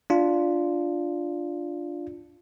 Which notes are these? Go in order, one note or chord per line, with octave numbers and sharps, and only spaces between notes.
D4 F4